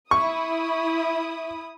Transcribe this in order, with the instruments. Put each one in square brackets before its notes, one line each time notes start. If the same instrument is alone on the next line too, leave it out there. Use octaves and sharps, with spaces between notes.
[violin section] E4 D#6 [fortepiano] C#6